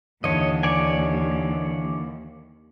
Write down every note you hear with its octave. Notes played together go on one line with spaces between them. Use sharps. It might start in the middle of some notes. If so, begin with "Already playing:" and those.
D#2 D3 E3 C#5 D#5
C#5 D5 G#5